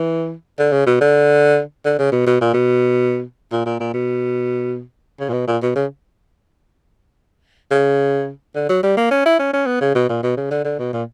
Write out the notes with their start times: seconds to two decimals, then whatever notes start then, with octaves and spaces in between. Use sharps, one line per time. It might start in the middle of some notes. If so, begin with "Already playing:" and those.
Already playing: E3
0.59 D3
0.72 C#3
0.86 B2
1.01 D3
1.85 D3
1.98 C#3
2.12 B2
2.27 B2
2.41 A#2
2.54 B2
3.52 A#2
3.66 A#2
3.80 A#2
3.94 B2
5.20 C#3
5.29 A#2
5.33 B2
5.47 A#2
5.62 B2
5.76 C#3
7.71 C#3
8.55 D3
8.69 F#3
8.83 G3
8.97 A#3
9.11 C#4
9.25 E4
9.39 C#4
9.53 C#4
9.66 B3
9.81 C#3
9.95 B2
10.09 A#2
10.23 B2
10.37 C#3
10.51 D3
10.65 D3
10.79 B2
10.93 A#2